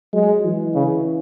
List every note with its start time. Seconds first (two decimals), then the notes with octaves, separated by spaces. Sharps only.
0.13 F#3 G#3
0.44 E3
0.75 C#3